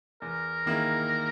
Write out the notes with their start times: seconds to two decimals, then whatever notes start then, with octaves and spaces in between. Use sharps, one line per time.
0.22 E2 A#4
0.66 D#3 A#3 E4 G#4